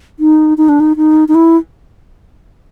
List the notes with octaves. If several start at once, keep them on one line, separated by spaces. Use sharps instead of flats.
D#4
D#4
D4
D#4
D#4
D#4
E4